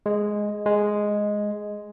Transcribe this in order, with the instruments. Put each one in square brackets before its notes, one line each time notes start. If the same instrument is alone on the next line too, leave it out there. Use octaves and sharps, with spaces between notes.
[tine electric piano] G#3
G#3